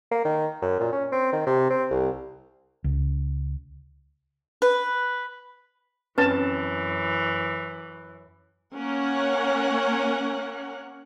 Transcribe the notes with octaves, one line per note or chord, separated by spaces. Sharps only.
A#3
D#3
F#2
A#2
C#4
C4
D#3
C3
C4
C2
C#2
B4
F#2 E3 C4 C#4 B4 A5
A#3 C#4 A#4 C#5 F#5